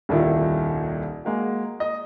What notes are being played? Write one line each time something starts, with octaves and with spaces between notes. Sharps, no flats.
D#1 C2 A#2 D#3 E4
G#3 A#3 F#4
D#5